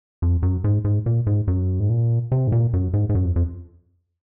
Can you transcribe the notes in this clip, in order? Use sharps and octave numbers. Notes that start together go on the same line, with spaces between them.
F2
F#2
G#2
G#2
A#2
G#2
F#2
G#2
A#2
C3
G#2
A#2
F#2
G#2
G#2
F#2
F2
F2